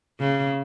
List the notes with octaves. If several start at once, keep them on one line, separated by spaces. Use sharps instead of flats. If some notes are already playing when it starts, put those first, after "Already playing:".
C#3